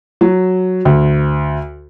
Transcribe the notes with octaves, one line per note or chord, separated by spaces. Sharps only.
F#3
D2